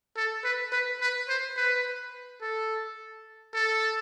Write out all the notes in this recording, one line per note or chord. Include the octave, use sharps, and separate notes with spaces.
A4
B4
B4
B4
C5
B4
A4
A4